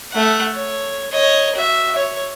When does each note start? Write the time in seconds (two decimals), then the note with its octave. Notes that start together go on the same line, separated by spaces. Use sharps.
0.11 A3 F#5
0.53 C#5
1.11 C#5 D#5
1.56 F#4 E5
1.96 C#5